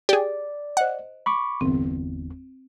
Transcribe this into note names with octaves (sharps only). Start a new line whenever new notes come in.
G4 G#4 D5
C5 D#5 F#5
B5 C#6 D6
G1 E2 C4